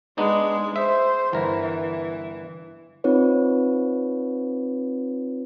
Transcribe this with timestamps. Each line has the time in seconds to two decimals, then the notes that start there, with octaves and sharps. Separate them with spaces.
0.18 G#3 B3 D4 D#4
0.76 C5 E5
1.33 G1 E3 A#4
3.04 C4 D#4 F4 B4 C#5